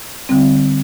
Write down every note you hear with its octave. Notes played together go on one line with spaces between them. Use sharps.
D3 G3 C4